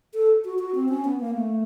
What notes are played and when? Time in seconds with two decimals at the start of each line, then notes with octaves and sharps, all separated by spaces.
0.14 A4
0.45 F#4
0.59 F#4
0.75 C4
0.89 C#4
1.05 B3
1.20 A#3
1.35 A3